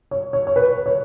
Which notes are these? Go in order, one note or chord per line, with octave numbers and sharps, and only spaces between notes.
C#5
C#5
C#5
B4
C#5